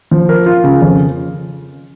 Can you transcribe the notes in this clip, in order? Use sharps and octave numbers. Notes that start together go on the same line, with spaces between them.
F3
A#4
F4
C#3
F2